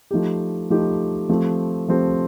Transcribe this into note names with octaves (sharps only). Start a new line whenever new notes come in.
F3 A3 D#4 G4
F3 A3 D#4 G4
F3 A3 C4 G4
F3 A3 C4 G4